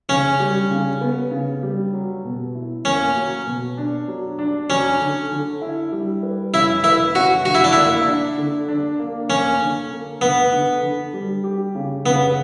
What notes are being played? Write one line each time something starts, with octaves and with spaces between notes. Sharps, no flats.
C#3 C#4
G3
C#3
B3
C#3
G3
F#3
B2
E4
A#3 C#4
F#3
B2
D4
F#3
D4
F#3 C#4
D3
D3
E4
G3
B4
C#4 E4
E4 B4
C#4 F#4
D3 F#4
E4
D4
A#3 E4
D4
D3
D4
A#3
A#3 C#4
D3
A#3
D3 B3
D3
D3
G3
G4
C#3
C#3 B3